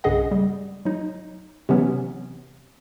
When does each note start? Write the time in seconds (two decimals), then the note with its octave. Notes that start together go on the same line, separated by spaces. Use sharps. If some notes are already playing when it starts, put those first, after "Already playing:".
0.04 B1 G2 C#3 G#4 D#5 F#5
0.31 G3
0.85 F#3 D#4
1.69 C3 E3 F#3 B3 C#4